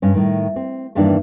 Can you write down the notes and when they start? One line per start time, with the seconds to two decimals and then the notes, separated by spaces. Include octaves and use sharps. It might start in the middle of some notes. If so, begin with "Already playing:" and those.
0.02 G2 C#4
0.14 A2 D#3
0.56 C4
0.95 E2 G2 D#3 E3 A#3 D4